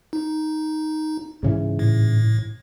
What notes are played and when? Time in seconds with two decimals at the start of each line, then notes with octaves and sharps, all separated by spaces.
0.13 D#4
1.43 G#2 C#3 E3
1.79 A2